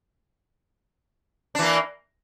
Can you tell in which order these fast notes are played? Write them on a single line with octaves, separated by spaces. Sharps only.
D4 E3 A#3